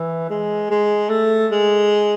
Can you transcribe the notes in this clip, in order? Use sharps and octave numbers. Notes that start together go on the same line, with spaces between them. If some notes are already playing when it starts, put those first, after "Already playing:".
Already playing: E3
G#3
G#3
A3
G#3